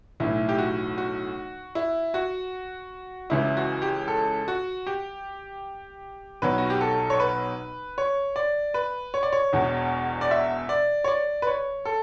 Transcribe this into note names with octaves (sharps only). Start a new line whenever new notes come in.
B1 A2 E3 E4
G4
F#4
F#4
E4
F#4
C#2 C#3 E3 E4
F#4
G4
A4
F#4
G4
B1 B2 F#3 B4
F#4
G4
A4
C#5
B4
C#5
D5
B4
C#5
D5
C#5
E1 E2 B2
D5
E5
D5
C#5
D5
B4
C#5
A4